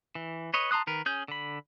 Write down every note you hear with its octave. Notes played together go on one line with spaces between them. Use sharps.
E3
B4 C#5 D#5
A5 A#5 C6 D#6 F#6
D#3 A#4 B4
C#4 G#4 G6
D3 B5